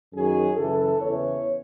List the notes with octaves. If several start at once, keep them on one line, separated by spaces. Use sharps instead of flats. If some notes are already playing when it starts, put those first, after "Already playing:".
F#2 D#3 F#3 G#4
F#2 C#3 E3 A4
E2 C#3 E3 C#5